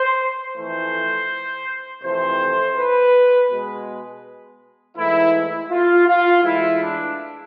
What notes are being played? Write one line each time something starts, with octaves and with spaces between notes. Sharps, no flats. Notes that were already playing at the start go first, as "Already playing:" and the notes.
Already playing: C5
F2 E3 A3 C5
F2 C3 E3 A3 C5
B4
B2 G#3
G#2 E3 A3 E4
F4
F4
A2 E3 G#3 E4
D4